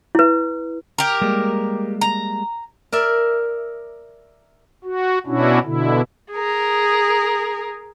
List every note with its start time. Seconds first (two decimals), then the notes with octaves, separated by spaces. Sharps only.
0.15 E4 B4
0.98 G4 A#4
1.22 G3 G#3 A#3
2.01 A#5
2.92 A#4 D5 E5
4.84 F#4
5.27 B2 C#4 D4 E4 F#4
5.64 B2 D3 E4
6.32 G#4 A#4